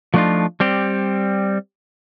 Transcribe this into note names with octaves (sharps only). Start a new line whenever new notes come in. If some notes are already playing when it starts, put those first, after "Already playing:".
F3 A3 B3 D4 D#4 F4
G3 C4 G4